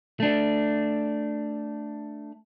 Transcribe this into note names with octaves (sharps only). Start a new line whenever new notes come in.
A3 D4